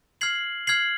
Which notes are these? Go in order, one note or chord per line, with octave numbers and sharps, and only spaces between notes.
F6 G#6 C7 F#7
F6 G#6 C7 F#7